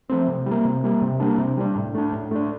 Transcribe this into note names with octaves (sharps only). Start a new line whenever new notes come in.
F3 A3 C4
C3
G3
A#3
C3
G3 A#3
C3
G3 A#3 D4
C3
G3 A#3 D4
A2
A3 D4
A2
A3 D4